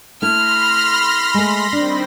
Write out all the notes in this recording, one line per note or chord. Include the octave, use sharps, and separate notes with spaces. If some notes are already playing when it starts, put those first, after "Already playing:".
A3 E4 B5 C6 F6 A#6
G#3 A3
D#3 G3 C4 D4